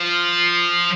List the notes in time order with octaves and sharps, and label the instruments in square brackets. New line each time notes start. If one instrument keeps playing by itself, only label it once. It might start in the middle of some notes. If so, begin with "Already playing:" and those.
Already playing: [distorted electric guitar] F3